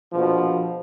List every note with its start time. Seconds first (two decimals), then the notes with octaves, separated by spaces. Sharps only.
0.13 A#1 B2 F3